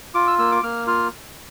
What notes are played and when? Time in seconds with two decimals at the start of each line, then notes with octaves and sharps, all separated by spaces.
0.14 F4 D6
0.27 E6
0.39 A#3 E6
0.52 D6
0.63 A#3 F6
0.87 F4 F6